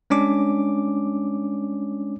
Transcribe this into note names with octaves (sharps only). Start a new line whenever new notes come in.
G#3 C#4 D4 D6